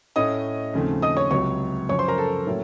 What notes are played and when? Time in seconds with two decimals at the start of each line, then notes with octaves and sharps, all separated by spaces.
0.16 A2 A3 C#4 D#5 D#6
0.74 D#2 C#3 F3 A3 C4
1.02 D#5 D#6
1.17 C#5 C#6
1.31 C#2 C3 F#3 C#5 C#6
1.89 F#2 C#3 F3 C#5 C#6
1.99 C5 C6
2.08 A#4 A#5
2.18 A4 A5
2.47 A2 F#3 A#3 C#4